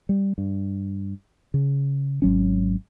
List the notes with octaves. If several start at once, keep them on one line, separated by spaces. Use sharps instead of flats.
G3
G2
C#3
G#1 F#3 C#4